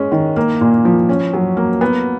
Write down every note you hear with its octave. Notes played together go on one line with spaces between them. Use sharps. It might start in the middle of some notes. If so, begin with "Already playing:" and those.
Already playing: G#3 C#4
D#3
A#3
A#2
F3
C#4
F#3
A#3
B3